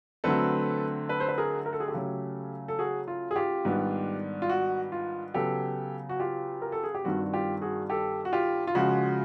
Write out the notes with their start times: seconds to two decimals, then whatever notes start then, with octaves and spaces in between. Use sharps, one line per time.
0.24 D3 F#3 A3 C4 A4 B4
1.09 A4 B4
1.20 C5
1.28 B4
1.38 G#4 A#4
1.66 A#4
1.73 A4
1.80 G#4
1.88 G4 A4
1.94 C#3 F#3 A3 C#4
2.68 A4
2.79 F#4 G#4
3.08 F4
3.31 G#4
3.36 F4 G4
3.65 G#2 D#3 G3 B3 D4
4.42 F4
4.49 F#4
4.92 F4
5.34 C#3 F#3 B3 G4 A4
6.09 F#4
6.20 F4 G4
6.62 A#4
6.72 A4
6.84 G#4
6.95 G4
7.04 G2 D#3 G3 C4 F#4
7.24 F#4
7.33 F4 G4
7.61 F#4 G#4
7.90 G4 A4
8.25 F#4
8.33 F4 G4
8.67 F4
8.75 C#3 F3 G#3 F#4